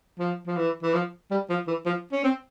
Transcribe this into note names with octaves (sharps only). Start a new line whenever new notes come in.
F3
F3
E3
E3
F3
G3
F3
E3
F3
C#4
C4